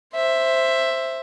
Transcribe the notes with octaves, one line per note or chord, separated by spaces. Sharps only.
C5 E5